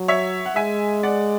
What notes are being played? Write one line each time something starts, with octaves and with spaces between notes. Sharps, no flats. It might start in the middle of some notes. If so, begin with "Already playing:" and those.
Already playing: F#3
C#5 E5
F#5
G#3 E5 G#5
D5 F#5